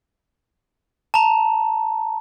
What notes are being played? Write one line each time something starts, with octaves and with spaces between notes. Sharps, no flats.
A5 A#5